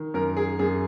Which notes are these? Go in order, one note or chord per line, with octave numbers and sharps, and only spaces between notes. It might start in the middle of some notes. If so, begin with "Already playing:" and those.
Already playing: D#3
F#2 A#4
G#4
F#2 G#4